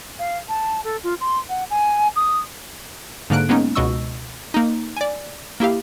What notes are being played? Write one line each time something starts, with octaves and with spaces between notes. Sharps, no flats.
F5
A5
A4
F4
C6
F#5
G#5
D#6
G#2 D3 A#3 F#6 D7
G#3 A#3 B3 C#4 D#4
C#2 B2 D#5 C#6 E6
A#3 D#4
D5 G#5
A#3 E4 G4 F5